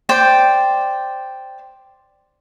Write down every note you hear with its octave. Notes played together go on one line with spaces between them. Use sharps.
C5 D5 G5